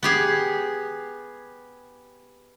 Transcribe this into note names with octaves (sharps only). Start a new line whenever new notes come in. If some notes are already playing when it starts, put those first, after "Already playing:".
B3 G4 G#4